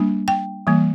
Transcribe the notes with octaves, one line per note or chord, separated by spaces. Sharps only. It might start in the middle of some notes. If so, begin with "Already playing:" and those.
Already playing: G3 A#3 D4
G5
E3 G3 A#3